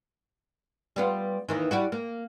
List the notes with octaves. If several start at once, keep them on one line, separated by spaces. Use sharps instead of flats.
G3 B3 F4
D#2 D#3 E3
G3 E4 F#4
A#3